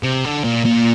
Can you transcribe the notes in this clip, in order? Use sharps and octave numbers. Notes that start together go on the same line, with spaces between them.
C3
D3
A#2
A#2